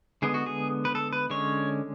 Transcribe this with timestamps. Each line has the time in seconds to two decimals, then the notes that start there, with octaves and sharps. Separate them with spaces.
0.22 D3 G#3 B3 G#4
0.34 F#4
0.46 G#4
0.85 B4
0.95 A4
1.13 B4
1.30 D3 G#3 C#4 C#5